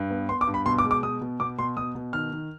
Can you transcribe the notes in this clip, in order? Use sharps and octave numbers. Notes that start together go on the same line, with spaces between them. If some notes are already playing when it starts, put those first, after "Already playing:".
Already playing: G2
B3
B3 C6
D6
G2
B5
B2 C6
D6
G#3
D6
B2 D#6
B2
B2 D6
B2 C6
B2 D#6
B2
D#3 F6
D#3